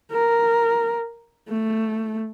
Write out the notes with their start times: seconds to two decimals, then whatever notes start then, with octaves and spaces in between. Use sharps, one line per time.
0.12 A#4
1.49 A3